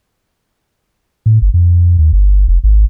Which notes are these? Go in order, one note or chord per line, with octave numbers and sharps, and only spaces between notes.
A2
G1
F2
D#2
G1
F1
G#1